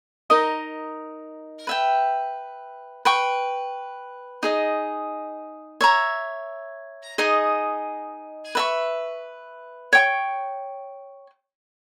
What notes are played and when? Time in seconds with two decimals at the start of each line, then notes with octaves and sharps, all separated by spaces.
0.30 D#4 A#4 D#5
1.67 B4 E5 G5
3.05 B4 G5 C#6
4.43 D#4 G#4 D#5
5.81 C#5 E5 A#5
7.18 D#4 G#4 D#5
8.55 B4 E5 A#5 C#6
9.93 C#5 G5 C#6